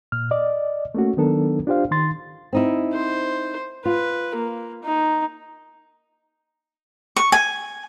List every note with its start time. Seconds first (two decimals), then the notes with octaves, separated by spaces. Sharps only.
0.12 A#2 F6
0.31 D5 D#5
0.95 A3 A#3 C#4 F#4
1.17 D#3 F#3 B3 D4 A4 A#4
1.67 D4 F4 G4 C5 F5
1.91 D#3 C6 A6
2.53 C4 D#4 E4
2.93 C5
3.85 F4 B4
4.35 A#3
4.83 D#4
7.16 C#6
7.32 G#5